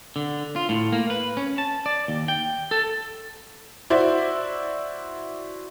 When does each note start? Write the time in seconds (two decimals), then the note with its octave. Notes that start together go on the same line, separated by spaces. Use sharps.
0.16 D3
0.56 F4
0.69 A2
0.93 A#3
1.10 B4
1.37 C#4
1.58 A5
1.86 D5
2.08 D#2
2.28 G5
2.71 A4
3.90 E4 F#4 C5 D5 E5